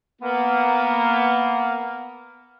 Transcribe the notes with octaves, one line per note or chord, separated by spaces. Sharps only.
A#3 B3